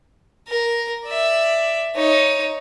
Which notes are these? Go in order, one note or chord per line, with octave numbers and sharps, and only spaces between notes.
A#4
D5 E5
D#4 C#5